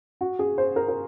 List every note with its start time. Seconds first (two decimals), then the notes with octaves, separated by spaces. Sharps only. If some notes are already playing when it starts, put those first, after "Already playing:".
0.21 F#4
0.39 G#4
0.58 C5
0.76 A#4
0.88 A#4